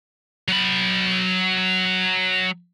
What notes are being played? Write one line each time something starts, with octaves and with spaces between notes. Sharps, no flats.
F#3 B5